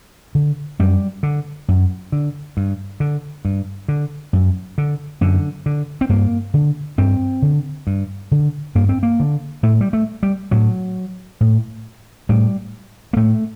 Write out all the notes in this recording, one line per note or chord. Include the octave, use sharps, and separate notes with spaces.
D3
F#2 G3
D3
F#2
D3
G2
D3
G2
D3
F#2
D3
F#2 D3
D3
C4
G2 A#3
D3
G2 C4
D3
G2
D3
G2 A#3
C4
A#3
D3
A2 A3
G3
A3
G3
A2 F#3
A2
A2 G3
A#3
A2 A3